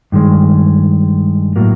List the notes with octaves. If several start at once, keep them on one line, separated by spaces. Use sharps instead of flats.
G2 D#3 G#3
A2 F#3 A#3